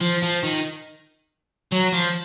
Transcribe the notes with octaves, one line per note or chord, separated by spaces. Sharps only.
F3
F3
D#3
F#3
F3